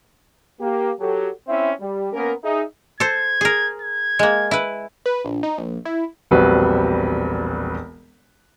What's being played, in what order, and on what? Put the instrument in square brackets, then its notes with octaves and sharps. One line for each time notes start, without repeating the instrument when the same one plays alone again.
[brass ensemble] A#3 G4
F#3 G4 A4
C4 C#4 E4 E5
G3
A#3 B3 C#4 A#4
D#4 G#4 E5
[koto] A4 C5 [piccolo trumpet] G#6
[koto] G#4 A#4
[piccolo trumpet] G#6
[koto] G#3 A#3
E4 B4
[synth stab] B4
A#1
D#4
A#1
E4
[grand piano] E1 A#1 G3 C4 F#4 B4